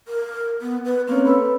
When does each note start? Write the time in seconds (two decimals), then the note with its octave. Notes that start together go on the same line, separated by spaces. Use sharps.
0.08 A#4
0.62 B3
0.85 B4
1.08 A#3 C4 C#4 C#5
1.25 A4 B4 B5